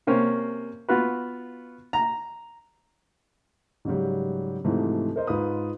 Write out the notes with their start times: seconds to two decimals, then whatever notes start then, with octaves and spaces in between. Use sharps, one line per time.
0.07 C3 A#3 C#4 C5
0.89 B3 F4 F#4 B4
1.93 A#5
3.85 G#2 C#3 F#3 G3
4.64 G#2 C3 E3 F3 A3
5.16 A#4 C5 D#5
5.27 G#2 F4 B4 D#6